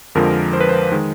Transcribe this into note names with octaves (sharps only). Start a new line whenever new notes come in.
F2 D3 F3 G#3 A#4
C5
B4
C5
D#3 G#3